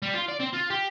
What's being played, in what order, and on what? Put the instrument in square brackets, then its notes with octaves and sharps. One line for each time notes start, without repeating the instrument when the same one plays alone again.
[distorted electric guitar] G3
F4
D5
C4
F4
G4